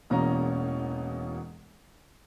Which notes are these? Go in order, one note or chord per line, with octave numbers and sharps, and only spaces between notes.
E1 E2 B2 A#3 C#4 A#5